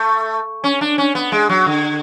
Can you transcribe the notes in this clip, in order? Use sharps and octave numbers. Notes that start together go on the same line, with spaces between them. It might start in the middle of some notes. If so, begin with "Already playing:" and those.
Already playing: A3
C#4
D4
C#4
B3
G#3
F#3
D3